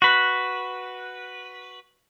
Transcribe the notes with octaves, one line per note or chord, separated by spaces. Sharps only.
F#4 B4